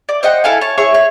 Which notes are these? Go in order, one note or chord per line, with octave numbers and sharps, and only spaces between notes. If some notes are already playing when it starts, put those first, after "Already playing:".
D5
C5 D#5 F#5 G5
E4 A4 F5 G#5
C#5 A5
E4 G#4 C#5 C#6
C#5